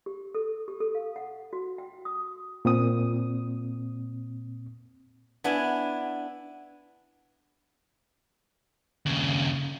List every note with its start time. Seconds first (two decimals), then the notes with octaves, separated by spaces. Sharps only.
0.06 G4
0.35 A4
0.68 G4
0.80 A4
0.95 F5
1.16 F#5
1.53 F#4
1.78 G5
2.05 D#6
2.65 A#2 C4 D#6
5.44 B3 D4 E4 G#5
9.06 D#2 C#3